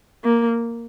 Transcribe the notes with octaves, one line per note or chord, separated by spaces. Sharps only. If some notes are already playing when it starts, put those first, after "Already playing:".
A#3